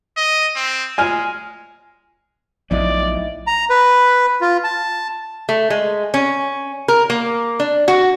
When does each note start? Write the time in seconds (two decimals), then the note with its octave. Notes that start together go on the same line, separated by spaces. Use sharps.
0.17 D#5
0.56 C4
0.98 G#3 G#5 F6
2.71 A#1 A2 F3 F#3 B3 D#4 E4 D5
3.47 A#5
3.70 B4
4.41 F4
4.64 A5
5.49 A3
5.70 G#3
6.14 C#4
6.88 A#4
7.10 A#3
7.60 D4
7.88 F#4